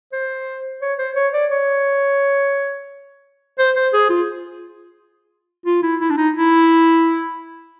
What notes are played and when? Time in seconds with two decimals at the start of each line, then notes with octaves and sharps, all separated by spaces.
0.12 C5
0.82 C#5
0.99 C5
1.16 C#5
1.34 D5
1.51 C#5
3.59 C5
3.76 C5
3.93 G#4
4.10 F4
5.66 F4
5.83 E4
6.01 E4
6.11 D4
6.17 D#4
6.36 E4